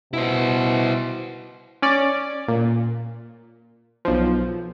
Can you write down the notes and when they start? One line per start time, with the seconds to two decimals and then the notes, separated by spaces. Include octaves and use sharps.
0.13 B2 E4 C5
1.82 C#4 D5
2.48 A#2
4.05 B1 F3